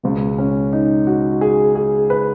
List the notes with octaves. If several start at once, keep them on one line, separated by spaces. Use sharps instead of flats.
C#2 B2
C#4
D#4
F#4
G#4
G#4
B4